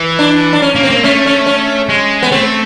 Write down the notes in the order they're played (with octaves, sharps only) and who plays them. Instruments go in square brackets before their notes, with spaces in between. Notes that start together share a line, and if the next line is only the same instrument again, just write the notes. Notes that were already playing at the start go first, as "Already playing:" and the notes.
Already playing: [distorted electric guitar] E3
[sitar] D4
D4
C#4
[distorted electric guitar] A#3
[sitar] C4
[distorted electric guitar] A#3
[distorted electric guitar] A3 [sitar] C#4
[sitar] C#4
C#4
[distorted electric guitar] G#3
[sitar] B3
[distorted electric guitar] A3 [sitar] C4